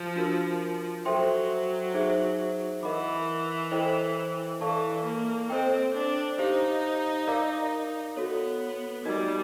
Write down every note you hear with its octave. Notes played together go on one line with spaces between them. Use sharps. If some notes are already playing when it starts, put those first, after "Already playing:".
Already playing: F3
D4 F#4 A#4
F#3 A4 C5 E5 G5 C6
D#4 G#4 C5 E5
E3 A#4 D#5 F#5 B5 D6
E4 A4 C5 D#5 G5
E3 A4 D5 F5 A5 C#6
A#3
C4 A4 C5 D#5 G5
D4
D#4 G4 C5 F5
A#4 D5 F5 A#5 D6
B3 F#4 A4 C#5
G3 D#4 F#4 A#4 D#5